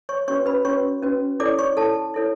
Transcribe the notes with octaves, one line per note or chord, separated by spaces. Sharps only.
C#5 C#6
C#4 F#4 B4 C#5 C#6
B4 B5
C#4 F#4 B4 C#5 C#6
C#4 F#4 B4
E4 A4 C#5 D5 D6
C#5 C#6
E4 A4 C#5 A5
E4 A4 C#5